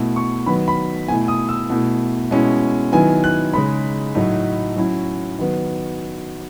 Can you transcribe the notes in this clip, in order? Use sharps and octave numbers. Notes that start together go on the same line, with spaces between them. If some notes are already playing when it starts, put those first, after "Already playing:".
Already playing: B2 A3 E4
C#6
D#3 F#3 B3 B5
B5
B2 A3 E4 G#5
D#6
E6
B2 A3 E4
B2 G#3 C#4 E4
D#3 F#3 B3 E4 G#5
F#6
C#3 G#3 D#4 B5
A2 F#3 A3 D#4
F#3 C#4 E4
D#3 F#3 B3